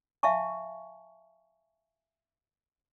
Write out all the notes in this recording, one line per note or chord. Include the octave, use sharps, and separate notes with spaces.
E5 F5 G#5 A5 C#6